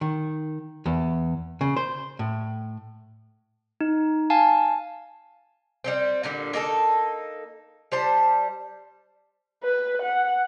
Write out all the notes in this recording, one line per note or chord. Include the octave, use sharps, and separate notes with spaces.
D#3
E2
C#3
C5
A2
D#4
F5 G#5 A5
G3 A3 C4
A#2 D3 G3
A#3 D#4 G#4 A4
G3 C5 A5
B4
F#5